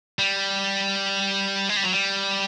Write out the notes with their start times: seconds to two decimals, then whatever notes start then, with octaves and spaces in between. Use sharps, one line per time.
0.19 G3
1.69 G#3
1.77 G3
1.84 F#3
1.93 G3